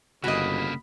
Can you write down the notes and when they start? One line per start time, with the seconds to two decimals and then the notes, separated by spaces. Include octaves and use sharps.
0.24 G1 C#3 A#3 F#4 D#5 B5